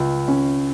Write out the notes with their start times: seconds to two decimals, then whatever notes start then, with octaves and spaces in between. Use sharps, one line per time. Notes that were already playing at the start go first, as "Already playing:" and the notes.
Already playing: C#2
0.28 C#4